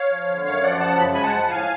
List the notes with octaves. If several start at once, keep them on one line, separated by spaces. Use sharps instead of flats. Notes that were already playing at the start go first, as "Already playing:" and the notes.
Already playing: C#5 F5
F3
D3
F#2 C#5 F5
F3 D5 F#5
C#3 F#5 A5
F#2 B5
G#3 G#5 B5
F#5 A5
F3
A2 F5 G#5